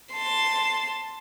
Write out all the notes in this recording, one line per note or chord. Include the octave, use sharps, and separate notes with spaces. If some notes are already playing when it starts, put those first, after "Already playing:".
A5 C6